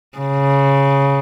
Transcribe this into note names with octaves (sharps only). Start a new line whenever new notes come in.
C#3